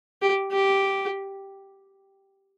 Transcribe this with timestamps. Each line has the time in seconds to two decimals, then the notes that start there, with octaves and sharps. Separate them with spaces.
0.22 G4
0.52 G4